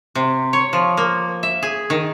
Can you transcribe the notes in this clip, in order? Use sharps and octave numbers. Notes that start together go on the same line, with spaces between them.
C3
C#5
F3
A#3
E5
G#4
D#3